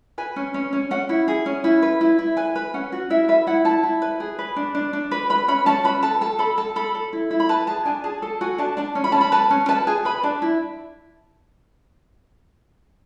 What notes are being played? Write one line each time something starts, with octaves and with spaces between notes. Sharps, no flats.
B4 G#5
C#4
C#4
C#4
C#4 F#5
E4
G#4
C#4
E4
B4
E4
E4
B4 G#5
B4
C#4 F#5
F#4
E4 E5
B4 E5
E4 F#5
E4 A5
E4
B4
G#4
B4
D4
D4
D4
B4
B4 B5
C#4 B5
C#4 A5
B4 B5
A4 A5
A4 A5
A4 B5
A4 A5
A4 B5
A4
E4
E4
B5
B4 A5
G#4 A5
D4 G#5
G#4 A5
A4 A5
F#4 G#5
D4 A5
D4 A5
C#4
B5
C#4 A5
B5
B4 A5
C#4
B4 A5
G#4 G#5
B4 B5
D4 A5
E4